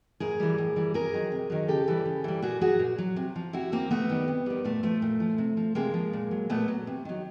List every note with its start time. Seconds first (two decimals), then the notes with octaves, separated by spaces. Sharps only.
0.20 A2 G#4 A#4
0.40 E3 G3
0.58 A2
0.76 E3 G3
0.94 C3 G#4 A#4
1.13 D#3 F#3
1.32 C3
1.50 D#3 F#3
1.68 C#3 G4 A4
1.88 E3 G3
2.05 C#3
2.24 E3 G3
2.42 A#2 F#4 G#4
2.61 F#3 F#4 G#4
2.79 A#2
2.98 F#3
3.16 C3
3.36 F3
3.53 C3 E4 F#4
3.72 F3 A#3 C4
3.90 C3 A3 B3
4.09 D#3 G3
4.28 C3
4.46 D#3 G3
4.64 A#2 A3
4.83 F3 A3
5.02 A#2
5.20 F3
5.38 C3
5.57 F3
5.75 C3 G#3 A#3
5.94 F3
6.13 A#2
6.31 F#3
6.49 A#2 A3 B3
6.68 F#3
6.87 C3
7.05 D#3 F#3